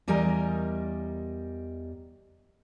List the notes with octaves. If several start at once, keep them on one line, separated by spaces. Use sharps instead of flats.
E2 G3 A#4 D#5 G#5 A#5